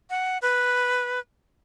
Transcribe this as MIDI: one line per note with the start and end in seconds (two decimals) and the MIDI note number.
0.10 0.38 78
0.42 1.19 71